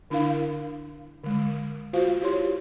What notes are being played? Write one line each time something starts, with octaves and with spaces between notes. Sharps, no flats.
D3 D4 E4 A#4 F5
D3 G#3
F4 F#4 C5 F5
E4 G4 C#5 C6